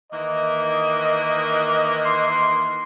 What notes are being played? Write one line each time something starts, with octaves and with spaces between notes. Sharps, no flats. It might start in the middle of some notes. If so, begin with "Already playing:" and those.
D#3 E3 A#3 D#5
C6